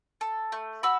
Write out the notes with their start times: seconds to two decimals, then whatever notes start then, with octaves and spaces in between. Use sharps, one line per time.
0.21 A4
0.52 A3
0.83 F#4 B5 E6